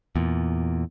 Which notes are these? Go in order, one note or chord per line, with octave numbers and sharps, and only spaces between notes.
E2 A#2